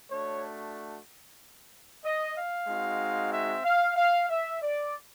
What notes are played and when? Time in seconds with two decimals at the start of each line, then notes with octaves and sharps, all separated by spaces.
0.10 A3 D4 F#4 C#5
2.04 D#5
2.36 F5
2.68 G#3 C4 D#4 F#4
3.33 E5
3.65 F5
3.97 F5
4.29 E5
4.61 D5